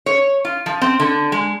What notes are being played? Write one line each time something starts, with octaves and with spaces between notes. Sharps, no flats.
C#5
F4
F3
C4
D3
G#3